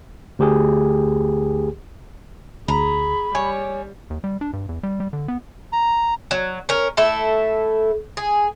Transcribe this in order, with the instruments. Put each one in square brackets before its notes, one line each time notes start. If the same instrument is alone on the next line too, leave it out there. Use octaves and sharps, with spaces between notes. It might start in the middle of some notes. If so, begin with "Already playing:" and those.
[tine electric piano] D2 G4 G#4
[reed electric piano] D2 [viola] G#4 [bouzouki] A#5 [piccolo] B5
[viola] G3 [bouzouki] C#5 [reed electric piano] G#5
[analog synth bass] D#2
G3
D4
G2
E2
G3
G3
D3
B3
[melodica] A#5
[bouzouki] F#3
C#4 A#4
A3 E4 A4
G#4